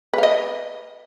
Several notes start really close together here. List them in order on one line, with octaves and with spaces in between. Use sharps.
B4 F5 D#5